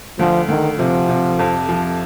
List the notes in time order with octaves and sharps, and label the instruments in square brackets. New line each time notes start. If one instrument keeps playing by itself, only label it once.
[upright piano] D2 [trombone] F3
[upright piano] D2 [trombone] D#3
[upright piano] C3 [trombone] F3
[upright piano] C3
F2
F3